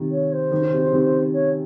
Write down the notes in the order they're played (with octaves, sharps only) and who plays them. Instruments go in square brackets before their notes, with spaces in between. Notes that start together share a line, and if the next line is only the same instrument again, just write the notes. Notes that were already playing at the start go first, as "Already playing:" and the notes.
Already playing: [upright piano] C3 D#3
[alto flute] C#5
C5
[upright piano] D#3
C#3
C3
C#3
C3 D#3
[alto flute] C#5